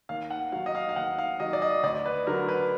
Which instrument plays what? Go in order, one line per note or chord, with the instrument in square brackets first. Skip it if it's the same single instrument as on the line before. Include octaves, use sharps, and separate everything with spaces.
[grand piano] D#2 F5
F#5
D#3 F#3 F5
D#5
F5
F5
D#2 F#5
F5
D#3 F#3 D#5
D5
D#5
D2 D5
B4
D3 F#3 A#4
B4